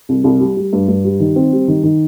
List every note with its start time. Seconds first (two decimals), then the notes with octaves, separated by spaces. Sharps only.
0.09 C2
0.24 C2
0.40 G3
0.57 G3
0.73 G2
0.88 G2
1.05 G3
1.20 D#3
1.36 C4
1.53 G3
1.68 D#3
1.83 D#3